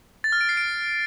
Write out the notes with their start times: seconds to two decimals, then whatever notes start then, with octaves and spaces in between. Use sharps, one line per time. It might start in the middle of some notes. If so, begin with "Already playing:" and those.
0.24 A6
0.32 F6
0.41 D7
0.49 C7
0.57 D7